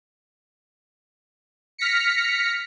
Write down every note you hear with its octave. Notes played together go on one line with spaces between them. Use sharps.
F6 A#6 B6 C#7